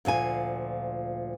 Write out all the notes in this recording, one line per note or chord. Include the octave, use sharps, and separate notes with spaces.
D2 A#2 F3 G#5